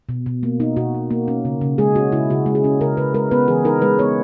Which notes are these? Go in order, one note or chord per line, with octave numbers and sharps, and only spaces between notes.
B2
B2
A#3
D#4
B2 F#4
B2
A#3
C#4
C#3
C#3
G#3 G#4
C#4 F#4
C#3 E4
C#3 F#4
G#3
G#4
C#4
C#3 A#4
C#3 B4
G#3 A#4
B3 B4
E3 G#4
D#4 A#4
G#3 B4
B3 C#5